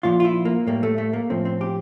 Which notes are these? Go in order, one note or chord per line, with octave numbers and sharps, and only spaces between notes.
A#2 F3 F4
F4
E4
A#3
A2 G3 A#3
A3
A3
A#3
A2 F3 C4
C4
G4